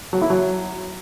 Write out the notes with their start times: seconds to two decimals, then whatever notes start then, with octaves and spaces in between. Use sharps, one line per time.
0.13 F#3
0.21 E4
0.30 F#3